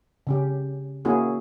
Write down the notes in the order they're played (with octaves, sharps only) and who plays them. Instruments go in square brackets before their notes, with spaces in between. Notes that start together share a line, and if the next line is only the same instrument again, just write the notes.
[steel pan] C#3 C#4 G4
A#3 C#4 E4 F#4 G#4